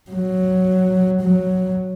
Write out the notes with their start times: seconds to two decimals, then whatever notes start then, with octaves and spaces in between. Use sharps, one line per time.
0.11 F#3
1.22 F#3